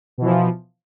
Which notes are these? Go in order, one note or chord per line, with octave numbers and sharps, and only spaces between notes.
B2 E3 F3